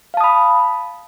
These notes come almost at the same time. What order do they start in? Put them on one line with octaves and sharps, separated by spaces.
F5 A5 D#6 B5